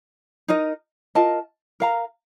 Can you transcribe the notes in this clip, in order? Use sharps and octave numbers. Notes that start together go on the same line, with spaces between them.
D#4 A#4 D#5
F4 A#4 D#5 A5
A#4 F5 A#5